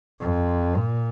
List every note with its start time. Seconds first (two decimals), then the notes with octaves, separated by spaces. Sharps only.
0.21 F2
0.77 A#2